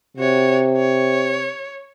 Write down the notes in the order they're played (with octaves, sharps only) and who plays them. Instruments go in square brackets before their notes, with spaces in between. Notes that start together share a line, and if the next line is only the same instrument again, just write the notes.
[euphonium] C3 [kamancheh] F#4 C#5
[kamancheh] C#5